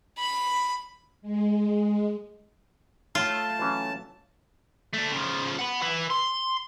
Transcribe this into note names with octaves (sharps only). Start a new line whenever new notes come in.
B5
G#3
A3 F4 C#5 G5 A5
E3 F#3 C#4
A3 D4
C#3 F3
F#5 B5
E4 B4
C6